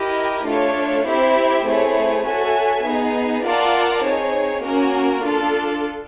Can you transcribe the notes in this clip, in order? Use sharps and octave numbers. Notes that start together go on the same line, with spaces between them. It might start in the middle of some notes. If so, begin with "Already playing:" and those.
Already playing: E4 G4 A#4 D#5
A3 D4 F4 A4 C#5
C4 E4 G4 C5 E5
A3 C4 E4 G#4 C#5
F#4 A4 C#5 E5 G#5
B3 D#4 G#4
F4 A#4 D5 F#5 A5
C4 D#4 G#4 C#5
A#3 C#4 F#4 A#4
D4 F4 A4